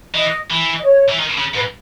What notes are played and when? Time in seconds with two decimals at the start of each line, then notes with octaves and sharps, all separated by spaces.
0.14 E3 D#5
0.51 E3
0.77 D#5
0.85 C#5
1.09 E3
1.19 D#3
1.38 C#3
1.55 G#2 B4